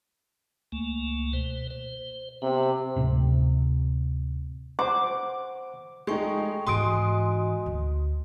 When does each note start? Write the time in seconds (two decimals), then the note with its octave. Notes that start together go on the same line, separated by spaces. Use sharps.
0.72 C#2 A3 A#3
1.33 B2 C5
1.70 C5
2.42 C3 B3
2.96 D1 G1 A2 C3
4.79 C5 F#5 D6
6.07 G#3 A3 D#4 G5 C#6
6.67 G#2 E3 F#4 D#5 G#5 C6 D#6 D7
7.66 D2